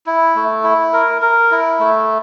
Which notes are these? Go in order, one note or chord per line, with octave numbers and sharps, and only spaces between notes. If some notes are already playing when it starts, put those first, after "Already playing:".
E4
A3
E4
A#4
A#4
E4
A3